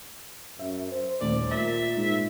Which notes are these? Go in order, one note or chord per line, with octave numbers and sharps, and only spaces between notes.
F#2 E5
C5
D#1 D2 D#3 D5
A#2 A#4 E5 A6
G#2